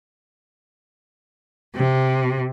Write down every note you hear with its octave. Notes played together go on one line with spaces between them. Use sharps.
C3